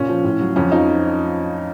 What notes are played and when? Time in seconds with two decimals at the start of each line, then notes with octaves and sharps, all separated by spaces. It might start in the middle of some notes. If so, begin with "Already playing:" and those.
Already playing: A#2 C#4
0.08 F3
0.24 A2
0.40 F#3
0.56 F2 C#4
0.71 F3 D#4